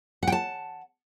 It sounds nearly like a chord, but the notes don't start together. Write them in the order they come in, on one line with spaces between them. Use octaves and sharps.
F#5 G5 A5